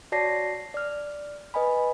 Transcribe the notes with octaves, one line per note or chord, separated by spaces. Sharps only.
F#4 C#5 D5 A5 A#6 C7
D5 F6
B4 D#5 G#5 B5